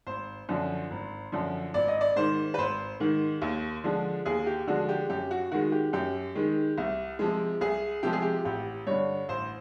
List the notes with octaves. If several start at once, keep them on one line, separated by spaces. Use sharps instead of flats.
G#1 C5
F#2 D3 F3
G#1
F#2 D3 F3
G#1 D5
D#5
D5
G#2 D#3 C5
B4
G#1 C5
G#2 D#3
D#2
D3 F3 G#3
D#2 G#4
G4
D3 F3 G#3 F#4
G4
F#2 G4
F#4
D#3 G#3 F#4
G4
F#2 G4
D#3 G#3
C2
C3 F3 G#3
C2 G#4
C3 F3 G#3 G4
G#4
G4
A1 G4
G2 D3 C#5
A1 C5